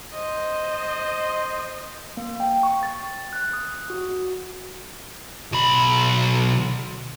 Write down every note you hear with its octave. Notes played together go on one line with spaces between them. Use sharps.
C5 D#5
A#3
G5
C#6
A6
F#6
D#6
F#4
B1 B5